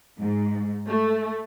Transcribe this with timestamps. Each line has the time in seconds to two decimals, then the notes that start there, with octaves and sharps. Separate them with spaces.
0.20 G#2
0.88 A3